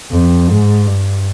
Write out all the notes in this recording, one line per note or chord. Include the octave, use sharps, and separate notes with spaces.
F2
G#2
G2